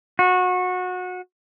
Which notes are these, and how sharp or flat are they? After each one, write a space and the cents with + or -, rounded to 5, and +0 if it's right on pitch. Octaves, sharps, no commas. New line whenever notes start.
F#4 -25